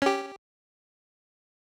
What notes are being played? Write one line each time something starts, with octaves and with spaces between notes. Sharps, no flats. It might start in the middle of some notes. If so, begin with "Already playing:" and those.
C#4 G4